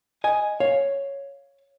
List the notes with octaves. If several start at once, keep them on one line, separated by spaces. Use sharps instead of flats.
D#5 G#5
C#5 F5